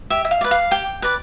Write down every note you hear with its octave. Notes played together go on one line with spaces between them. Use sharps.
G4 E5
E5
F5
B4 D5
F5
G4 G5
B4 D5